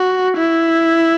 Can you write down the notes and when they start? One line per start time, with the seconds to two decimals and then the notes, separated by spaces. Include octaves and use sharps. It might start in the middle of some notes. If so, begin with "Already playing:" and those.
Already playing: F#4
0.37 E4